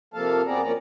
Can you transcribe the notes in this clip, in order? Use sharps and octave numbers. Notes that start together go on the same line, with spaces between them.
C3 F3 A#3 A4 F5 A5
F#2 B3 C4 G#4 D5 A#5
F#2 F3 A#3 C#4 D5 A#5